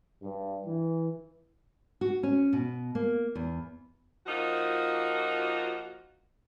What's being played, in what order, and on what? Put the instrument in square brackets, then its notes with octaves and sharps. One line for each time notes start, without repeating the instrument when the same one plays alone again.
[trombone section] G2
E3
[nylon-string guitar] F#4
C#4
B2
A#3
E2
[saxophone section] F3 A#3 D#4 F4 F#4